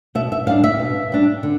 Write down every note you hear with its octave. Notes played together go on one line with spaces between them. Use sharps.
B2 E5
E5
G3 D4 F5
E5
B2
G3 D4
D3